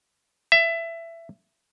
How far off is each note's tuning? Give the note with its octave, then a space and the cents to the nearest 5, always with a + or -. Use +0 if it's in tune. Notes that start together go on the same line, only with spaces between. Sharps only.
E5 +20